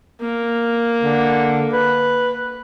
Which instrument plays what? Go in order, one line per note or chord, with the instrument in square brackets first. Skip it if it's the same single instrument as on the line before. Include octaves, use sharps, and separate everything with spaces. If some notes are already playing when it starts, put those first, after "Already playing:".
[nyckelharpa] A#3
[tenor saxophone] D3
B4